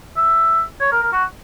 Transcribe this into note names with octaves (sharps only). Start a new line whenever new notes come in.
E5
C#5
A#4
A#4
F#4